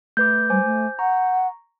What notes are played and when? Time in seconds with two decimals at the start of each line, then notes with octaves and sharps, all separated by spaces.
0.17 A3 B4 D6 G6
0.50 G3 C5 G#5 D6
0.64 A3
0.99 F#5 A#5 C#6